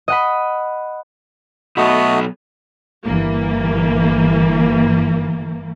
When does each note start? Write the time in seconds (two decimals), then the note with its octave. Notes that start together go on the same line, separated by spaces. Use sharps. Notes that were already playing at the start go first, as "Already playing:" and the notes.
0.08 D#5 F#5 B5
1.77 B1 A3 B3 F#4 D#5
3.04 G1 E3 A#3